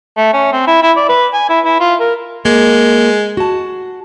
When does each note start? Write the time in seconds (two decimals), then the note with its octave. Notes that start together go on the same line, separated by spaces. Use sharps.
0.17 A3
0.33 C#4
0.53 C4
0.67 E4
0.82 E4
0.97 D5
1.09 B4
1.33 G#5
1.49 E4
1.65 E4
1.80 F4
2.00 A#4
2.45 G#3 A#3
3.37 F#4 A5